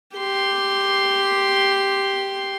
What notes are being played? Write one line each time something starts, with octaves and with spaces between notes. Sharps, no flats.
G4 C6